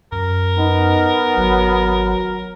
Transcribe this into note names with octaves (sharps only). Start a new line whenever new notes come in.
F#2 A#4
B3 D#4
G#1 F#3